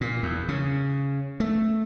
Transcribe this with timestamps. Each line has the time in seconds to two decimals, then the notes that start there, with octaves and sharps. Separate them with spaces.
0.01 A#2
0.23 E2
0.48 C#3
1.40 A3